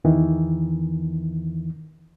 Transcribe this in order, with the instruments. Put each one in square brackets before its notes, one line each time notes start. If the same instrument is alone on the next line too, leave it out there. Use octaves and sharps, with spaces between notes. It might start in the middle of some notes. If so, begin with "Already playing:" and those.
[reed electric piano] E2 D#3 E3